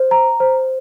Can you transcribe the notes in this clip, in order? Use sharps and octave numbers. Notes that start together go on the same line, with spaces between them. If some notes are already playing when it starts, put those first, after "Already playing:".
Already playing: C5
A#5
C5